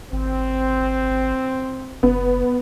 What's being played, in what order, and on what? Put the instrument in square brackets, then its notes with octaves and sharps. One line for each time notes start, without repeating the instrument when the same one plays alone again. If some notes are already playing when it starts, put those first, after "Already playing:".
[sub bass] G#1 [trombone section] C4
[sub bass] F#1 [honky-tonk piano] B3